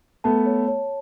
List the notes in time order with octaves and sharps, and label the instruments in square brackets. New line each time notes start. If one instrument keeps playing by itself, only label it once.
[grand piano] A3 B3 [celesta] A5
[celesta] C#5
C#5